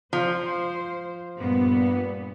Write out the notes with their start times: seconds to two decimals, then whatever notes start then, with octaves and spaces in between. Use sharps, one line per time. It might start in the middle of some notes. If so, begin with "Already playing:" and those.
0.13 F3 C5
1.38 G2 A#2 B3